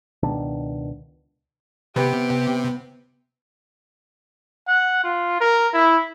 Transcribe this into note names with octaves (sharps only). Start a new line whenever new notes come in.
C#2 B2 D#3 D4
C3 B3 G4
F#5
F4
A#4
E4